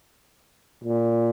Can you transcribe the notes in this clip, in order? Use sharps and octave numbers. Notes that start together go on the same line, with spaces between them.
A#2